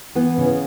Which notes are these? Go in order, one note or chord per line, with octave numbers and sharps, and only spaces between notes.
E3 B3
C#3